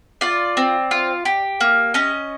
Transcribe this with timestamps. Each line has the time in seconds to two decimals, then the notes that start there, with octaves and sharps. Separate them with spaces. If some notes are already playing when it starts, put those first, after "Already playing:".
0.21 F4 D5
0.57 C4
0.91 F4
1.25 G4
1.61 A#3
1.94 C#4 D#5